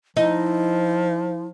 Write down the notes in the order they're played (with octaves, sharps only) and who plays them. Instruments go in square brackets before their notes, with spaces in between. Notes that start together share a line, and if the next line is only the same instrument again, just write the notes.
[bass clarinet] F3 [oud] D#4 [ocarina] E4